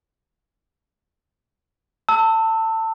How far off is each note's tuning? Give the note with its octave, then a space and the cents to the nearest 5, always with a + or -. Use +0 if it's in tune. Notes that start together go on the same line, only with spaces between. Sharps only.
A5 +25 E6 -15